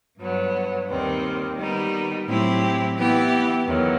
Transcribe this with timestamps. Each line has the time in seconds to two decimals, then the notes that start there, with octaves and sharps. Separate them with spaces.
0.20 G2 F#3 B3
0.89 D#2 D#3 G3 C4
1.57 D#3 G3 B3 D#4
2.27 A2 F#3 C4 E4 G4
2.96 E3 B3 E4 G4
3.65 E2 D#3 F#3